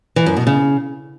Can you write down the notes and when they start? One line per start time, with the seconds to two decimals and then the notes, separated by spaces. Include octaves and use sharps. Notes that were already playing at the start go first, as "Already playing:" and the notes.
0.16 E3
0.26 F#2
0.37 B2
0.47 C#3